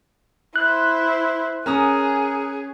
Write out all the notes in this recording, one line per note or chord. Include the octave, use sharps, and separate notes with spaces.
E4 C5 F#6
C#4 G#4 A#4 A#5 D#6